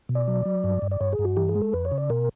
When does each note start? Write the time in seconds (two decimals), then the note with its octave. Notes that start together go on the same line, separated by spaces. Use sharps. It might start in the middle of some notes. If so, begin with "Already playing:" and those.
0.09 B2
0.15 D5
0.28 F#3
0.45 F#3
0.64 G2
0.82 G2
0.91 D5
1.01 G2 C#5
1.13 G#4
1.19 G2
1.25 F#4
1.37 E3 G4
1.49 G#4
1.55 G#3
1.61 A4
1.73 F2 B4
1.85 C#5
1.91 C#3
1.98 D5
2.10 B2 A#4